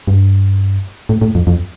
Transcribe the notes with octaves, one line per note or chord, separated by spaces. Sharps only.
G2
A2
A2
F2
F2